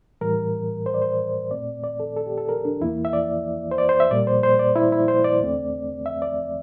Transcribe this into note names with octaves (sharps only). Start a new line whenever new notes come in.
A2 E3 G3 A#4
C5
D5
C5
A#2 A3 C4 D5
D5
A4
A4
G4
A4
A#4
D4
E2 E3 A#3 E4
E5
D5
C5
D5
C5
E5
A#2 G3 A#3 D5
C5
C5
D5
E4
E4
C5
D5
E2 D3 A3 C4
E5
D5